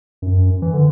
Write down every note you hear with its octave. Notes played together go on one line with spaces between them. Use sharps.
F#2
E3
D3